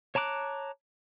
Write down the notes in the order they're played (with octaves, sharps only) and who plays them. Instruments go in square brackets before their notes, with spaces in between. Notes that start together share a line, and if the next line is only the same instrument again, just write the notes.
[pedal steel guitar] C#5 A5 A#5 D6 F#6